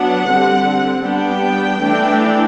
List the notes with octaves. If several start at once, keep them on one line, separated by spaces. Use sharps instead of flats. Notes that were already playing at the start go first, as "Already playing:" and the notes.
Already playing: F#3 B3 D4 F#5
D3 G3 C4
G3 B3 D4 G5
E3 A3 D4